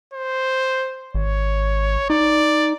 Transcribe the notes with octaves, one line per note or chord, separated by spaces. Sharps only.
C5
G#1 C#5
D#4 D5